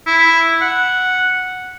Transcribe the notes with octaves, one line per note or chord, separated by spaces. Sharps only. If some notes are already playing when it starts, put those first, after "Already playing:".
E4
F#5